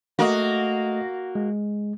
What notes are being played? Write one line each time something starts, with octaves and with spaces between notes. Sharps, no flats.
A3 A#3 F#4 D#5
G#3